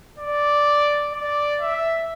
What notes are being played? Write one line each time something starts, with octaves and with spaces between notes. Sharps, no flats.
D5
D5
E5